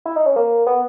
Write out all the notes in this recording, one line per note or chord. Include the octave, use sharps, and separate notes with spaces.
E4
D#4
C#4
A#3
B3